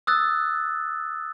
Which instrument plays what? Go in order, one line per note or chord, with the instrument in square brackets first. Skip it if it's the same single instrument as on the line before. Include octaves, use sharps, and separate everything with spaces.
[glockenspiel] D#6 E6 F#6 A6